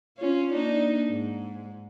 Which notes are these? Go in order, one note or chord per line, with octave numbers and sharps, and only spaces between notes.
C#4 F4
A#3 D4 D#4
G#2